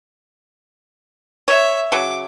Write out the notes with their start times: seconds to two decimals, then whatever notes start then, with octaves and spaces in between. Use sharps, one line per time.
1.48 C#5 E5
1.92 C#3 F#3 D6